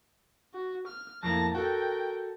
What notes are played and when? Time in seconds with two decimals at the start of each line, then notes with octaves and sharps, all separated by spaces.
0.54 F#4
0.87 F6
1.23 F2 A2 A#3 A5 A#6
1.55 F#4 A4 A#4 G5